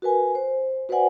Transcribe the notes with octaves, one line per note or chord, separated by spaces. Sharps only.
F#4 A#4 B4 G#5
C5
F#4 B4 C5 D5 F#5 G#5